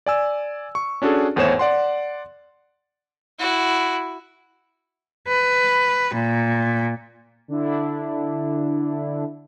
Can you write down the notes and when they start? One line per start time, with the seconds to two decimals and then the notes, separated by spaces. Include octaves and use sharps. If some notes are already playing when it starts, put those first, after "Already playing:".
0.06 D5 G#5 E6
0.75 C#6
1.02 C#4 D4 F#4 G#4 A4
1.36 G#1 E2 A2 C5 C#5 E7
1.59 D5 F#5 C6
3.39 E4 F#4
5.28 B4
6.14 A#2
7.48 D3 D4 E4